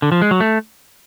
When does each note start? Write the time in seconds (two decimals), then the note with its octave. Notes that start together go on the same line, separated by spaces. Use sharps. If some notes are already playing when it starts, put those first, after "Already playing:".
0.02 D3
0.12 F3
0.22 G#3
0.31 F#3
0.40 A3